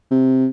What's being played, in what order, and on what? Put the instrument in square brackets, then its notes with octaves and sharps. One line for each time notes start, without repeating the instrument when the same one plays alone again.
[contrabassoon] C3